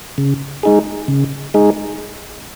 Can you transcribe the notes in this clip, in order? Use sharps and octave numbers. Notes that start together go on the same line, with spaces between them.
C#3
G#3 D#4 G#4
C#3
G#3 D#4 G#4